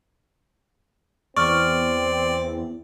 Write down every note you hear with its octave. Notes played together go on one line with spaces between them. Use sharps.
E2 C4 D5 C#6 F6